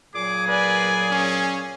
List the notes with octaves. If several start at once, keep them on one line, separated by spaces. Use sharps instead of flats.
A#2 F#3 G#4 D6
B4 D5 G#5
C#4